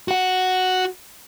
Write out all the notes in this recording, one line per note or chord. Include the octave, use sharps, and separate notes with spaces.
F#4 F#5